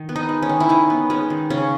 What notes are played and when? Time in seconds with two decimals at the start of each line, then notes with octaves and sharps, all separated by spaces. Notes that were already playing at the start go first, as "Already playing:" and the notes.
Already playing: D#3
0.09 B3
0.16 D#4
0.29 G#3
0.42 C#4
0.49 D#3
0.60 E4
0.69 D#3 D#4
0.90 B3
1.10 G#3 C#4
1.30 D#3
1.50 C#3 C#4